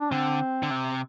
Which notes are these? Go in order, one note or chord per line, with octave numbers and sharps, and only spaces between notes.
D4
D3 C4
D3
C3